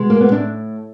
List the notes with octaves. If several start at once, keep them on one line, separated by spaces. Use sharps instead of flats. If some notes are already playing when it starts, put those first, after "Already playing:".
Already playing: B2 G#3
A#3
B3
A2 D4